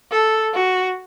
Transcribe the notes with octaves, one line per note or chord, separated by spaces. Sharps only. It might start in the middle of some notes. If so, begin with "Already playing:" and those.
A4
F#4